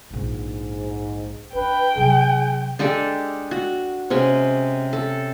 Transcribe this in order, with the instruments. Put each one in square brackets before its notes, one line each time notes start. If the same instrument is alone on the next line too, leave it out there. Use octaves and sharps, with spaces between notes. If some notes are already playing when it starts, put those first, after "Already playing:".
[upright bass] A#1 D3 [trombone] G#2
[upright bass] D4 [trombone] B4 [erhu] G5
[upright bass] C3 F#3 [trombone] G#4
[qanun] G#3 D4 G4 A4
F#4
C3 G#3 C#4
A4